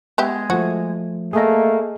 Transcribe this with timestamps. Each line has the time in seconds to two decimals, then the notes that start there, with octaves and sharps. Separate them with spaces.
0.18 G#3 B3 G4 E5
0.50 F3 A3 F#4
1.33 A3 A#3 G#4 D#5